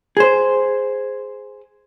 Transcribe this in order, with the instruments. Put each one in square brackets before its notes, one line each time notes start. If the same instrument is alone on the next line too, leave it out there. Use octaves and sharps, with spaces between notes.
[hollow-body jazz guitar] G#4 C5